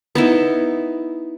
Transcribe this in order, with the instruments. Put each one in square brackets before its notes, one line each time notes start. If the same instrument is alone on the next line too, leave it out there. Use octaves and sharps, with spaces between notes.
[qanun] B3 D#4 E4